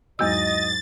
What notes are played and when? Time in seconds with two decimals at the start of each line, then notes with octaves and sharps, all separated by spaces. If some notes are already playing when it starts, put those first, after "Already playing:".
0.19 E2 G#2 F#3 D#5 E6 A6